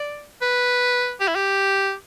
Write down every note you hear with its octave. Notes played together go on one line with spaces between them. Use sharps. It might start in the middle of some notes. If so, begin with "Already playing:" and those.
Already playing: D5
B4
G4
E4
G4